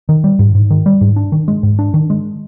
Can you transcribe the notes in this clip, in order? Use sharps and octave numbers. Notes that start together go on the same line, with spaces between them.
D#3
G3
G#2
G#2
D#3
G3
G#2
D4
D#3
G#3
G#2
D4
D#3
G#3